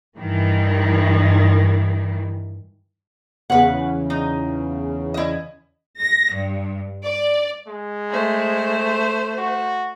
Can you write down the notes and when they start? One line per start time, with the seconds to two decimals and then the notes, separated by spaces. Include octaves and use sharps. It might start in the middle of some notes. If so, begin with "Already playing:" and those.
0.17 G2 D#3 E3
3.50 E2 C#3 B4 F#5
4.10 D#4
5.14 E4 D#5
5.99 A#6
6.33 G2
7.04 D5
7.67 G#3
8.10 A3 C5
9.38 F#4